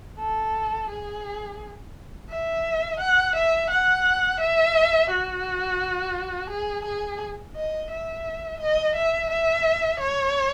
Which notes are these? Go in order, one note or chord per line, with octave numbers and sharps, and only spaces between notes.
A4
G#4
E5
F#5
E5
F#5
E5
F#4
G#4
G#4
D#5
E5
D#5
E5
E5
C#5